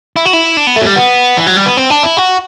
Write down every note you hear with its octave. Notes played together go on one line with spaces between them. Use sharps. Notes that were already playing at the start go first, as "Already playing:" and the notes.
E4
F#4
E4
D4
B3
A3
F#3
G3
B3
E3
F#3
G3
B3
C4
D4
E4
F#4